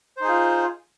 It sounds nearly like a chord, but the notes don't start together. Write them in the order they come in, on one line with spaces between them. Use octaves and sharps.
C5 D#4 G#4 F4